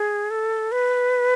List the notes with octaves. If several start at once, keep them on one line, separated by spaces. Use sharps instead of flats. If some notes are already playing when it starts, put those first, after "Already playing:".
Already playing: G#4
A4
B4